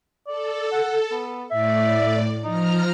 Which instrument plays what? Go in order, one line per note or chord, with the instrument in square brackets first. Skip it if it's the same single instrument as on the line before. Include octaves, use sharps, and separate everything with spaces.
[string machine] A4 [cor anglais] D5
[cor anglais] F#5
B3
[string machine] A2 D5 [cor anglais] E5
[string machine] F3 A#5 F6 [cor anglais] D#4